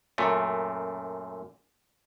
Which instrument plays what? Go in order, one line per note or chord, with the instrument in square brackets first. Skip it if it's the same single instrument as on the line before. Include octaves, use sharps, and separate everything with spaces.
[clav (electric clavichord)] F#2 A#2 A3